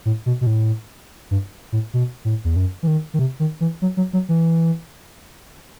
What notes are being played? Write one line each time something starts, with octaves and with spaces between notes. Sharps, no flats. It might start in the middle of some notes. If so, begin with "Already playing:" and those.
A2
B2
B2
A2
G2
A2
B2
A2
E2
F#2
E3
D#3
D#3
C3
D#3
E3
F#3
F#3
F#3
E3